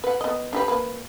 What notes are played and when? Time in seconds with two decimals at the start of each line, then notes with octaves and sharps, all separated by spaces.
0.04 B4 F#5
0.21 B3 D#5
0.53 D4 G4 B4
0.68 A#3 B4